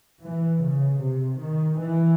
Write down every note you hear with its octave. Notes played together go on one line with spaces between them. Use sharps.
E3
C#3
C3
D#3
E3